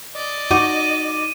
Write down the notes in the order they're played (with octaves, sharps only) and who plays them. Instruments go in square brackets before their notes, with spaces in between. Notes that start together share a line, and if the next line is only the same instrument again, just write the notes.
[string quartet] D5 D#5
[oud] D#4 F#4 [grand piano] D6 [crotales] D#7